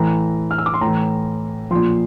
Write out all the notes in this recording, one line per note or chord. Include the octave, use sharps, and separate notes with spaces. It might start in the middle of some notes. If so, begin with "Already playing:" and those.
Already playing: A2 E3 A#5
F6
E6
D6
C6
A2 E3 A#5
A#2 F3 C6